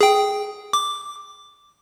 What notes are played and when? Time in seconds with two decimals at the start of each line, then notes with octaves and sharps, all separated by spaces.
0.01 G#4 G5
0.73 D6